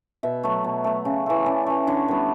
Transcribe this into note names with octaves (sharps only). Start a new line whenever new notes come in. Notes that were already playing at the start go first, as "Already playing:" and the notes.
B2 E5
F#3 A3
B2
F#3 A3
C#3
E3 A3
C#3 D5
E3 A3
D3 C#5
G3 B3 B4